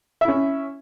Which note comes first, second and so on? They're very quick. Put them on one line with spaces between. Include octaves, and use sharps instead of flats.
E5 E4 C#4